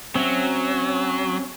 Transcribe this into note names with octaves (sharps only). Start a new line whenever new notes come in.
F#3 C4 C#4 E5